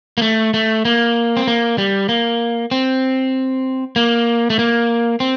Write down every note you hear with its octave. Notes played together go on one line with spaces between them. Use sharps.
A#3
A3
A3
A#3
C4
A#3
G3
A#3
C4
A#3
A3
A#3
C4